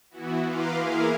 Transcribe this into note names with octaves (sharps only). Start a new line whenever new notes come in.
E3 B3 E4 F#4
B4 F5 A#5 C6 D6
A#3 E4 G#4 A#4 F5